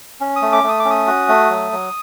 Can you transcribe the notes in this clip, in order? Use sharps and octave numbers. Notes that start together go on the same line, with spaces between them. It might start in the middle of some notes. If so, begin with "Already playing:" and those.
C#4
D#6
A3
D6
A3 D#6
D6
C#4
D#6
F#4
A3
F#3
F#3